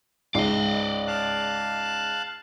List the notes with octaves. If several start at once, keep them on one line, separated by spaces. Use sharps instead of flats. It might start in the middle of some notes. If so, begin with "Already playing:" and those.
C#2 G#2 D5 D#5 C7
F5 A5 F#6